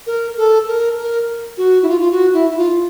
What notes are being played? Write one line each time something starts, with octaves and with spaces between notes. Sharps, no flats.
A#4
A4
A#4
A#4
F#4
E4
F4
F4
F#4
E4
E4
F4